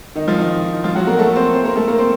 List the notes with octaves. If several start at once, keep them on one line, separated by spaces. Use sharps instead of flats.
D#3 D#4
F3 F4
D#3 D#4
F3 F4
F#3 F#4
A#3 A#4
A3 A4
C4 C5
C4 C5
A#3 A#4
A3 A4
A#3 A#4
C4 C5